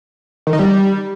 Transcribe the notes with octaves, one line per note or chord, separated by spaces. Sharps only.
D#3
D#4
G3